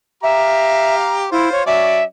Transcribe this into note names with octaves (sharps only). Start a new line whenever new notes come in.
G4 E5 F5 A#5
E4 F4 C5
C#5
F#3 C#4 D5 E5